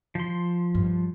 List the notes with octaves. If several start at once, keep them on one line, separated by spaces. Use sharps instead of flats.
F3 C6
G2